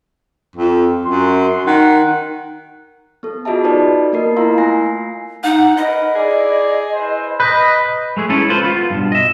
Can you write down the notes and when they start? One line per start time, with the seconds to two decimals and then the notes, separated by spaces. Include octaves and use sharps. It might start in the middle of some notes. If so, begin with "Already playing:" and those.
0.56 F2
1.05 F#2 C6
1.66 D#3 F#5
3.23 B3 A4
3.45 F4 F#4 G#4 D#5 E5 A5
3.64 D#4 F4 A4 B4 D5 A5
4.13 A#3 B3 F4 A#4 D#5 C7
4.37 E4 F4 F5 A#5 C6 E6
4.58 A3 G#5 A#6 C7
5.44 D#4 F#5
5.77 A#4 B4 D#5
6.15 E4 G#4 D5
6.94 E4 B4 C5
7.40 B4 D#5 B5 F#6 G6
8.17 G#3 A3 G#4
8.29 G#3 C#4 E4 A4 B4
8.49 F4 A4 B4 C5
8.63 B3 F4
8.90 G2 B2
9.12 D#5 E5